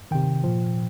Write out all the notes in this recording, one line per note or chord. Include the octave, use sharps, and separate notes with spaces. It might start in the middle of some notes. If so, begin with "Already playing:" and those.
C3 D#3 G5
A#2 F3